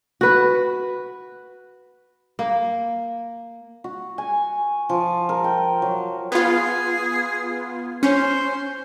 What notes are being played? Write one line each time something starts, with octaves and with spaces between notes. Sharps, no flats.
F#4 B4
A#3
F#4
G#5
F3
A#4
G5
F#3
B3 F4 G#4
C#4 C5